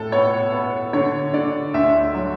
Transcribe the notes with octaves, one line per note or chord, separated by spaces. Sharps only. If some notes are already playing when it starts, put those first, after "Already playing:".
Already playing: A2 A4
B3 C#5
B3
D3 C#5
D3 D5
D2 E5
F#3